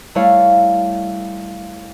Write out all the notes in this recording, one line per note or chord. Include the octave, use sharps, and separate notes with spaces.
G3 A3 E4 C#5 F5